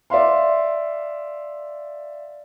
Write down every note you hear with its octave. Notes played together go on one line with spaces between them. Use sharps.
D5 E5 F5 C6